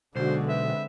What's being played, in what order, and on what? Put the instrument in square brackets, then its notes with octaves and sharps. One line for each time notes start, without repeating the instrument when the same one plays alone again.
[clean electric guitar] B1 [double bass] D3 G#3 [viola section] D4 F#4 [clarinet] C5
[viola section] C4 B4 [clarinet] E5